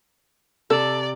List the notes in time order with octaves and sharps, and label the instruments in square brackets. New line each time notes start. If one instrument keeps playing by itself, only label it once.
[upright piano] C3 [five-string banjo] A4 [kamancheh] D5